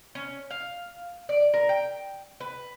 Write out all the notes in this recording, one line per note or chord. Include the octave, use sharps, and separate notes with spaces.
C#4
F5
D5
A#4
G5
B4